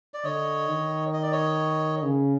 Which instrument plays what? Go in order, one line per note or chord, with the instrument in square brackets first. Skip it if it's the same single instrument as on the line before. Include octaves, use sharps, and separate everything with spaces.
[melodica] D5
[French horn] D3 [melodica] C#5 D#5
[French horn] D#3
[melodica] D#5
D5
C#5 D#5
[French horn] C#3